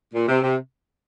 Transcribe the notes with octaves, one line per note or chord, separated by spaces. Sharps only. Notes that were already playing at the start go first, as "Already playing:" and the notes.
A#2
C3
C3